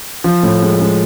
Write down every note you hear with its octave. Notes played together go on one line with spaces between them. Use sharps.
F3
A2
G#3
G#3